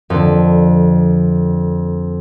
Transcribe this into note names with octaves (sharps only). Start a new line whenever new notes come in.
F2 D3